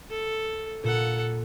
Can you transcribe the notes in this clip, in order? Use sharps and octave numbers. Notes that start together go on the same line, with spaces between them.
A4
A#2 A4 F#5